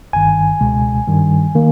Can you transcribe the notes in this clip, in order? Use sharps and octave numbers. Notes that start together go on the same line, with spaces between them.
G1 G2 D#3 G#5
C#2 B2 G#3
G2 D#3 G3
D#3 A#3